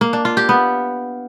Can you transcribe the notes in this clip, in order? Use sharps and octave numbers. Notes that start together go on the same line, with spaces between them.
A#3
D4
F4
G4
B3